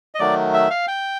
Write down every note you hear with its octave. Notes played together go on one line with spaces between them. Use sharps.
D#5
D#3 F#3 A3 D5
E5
F5
G5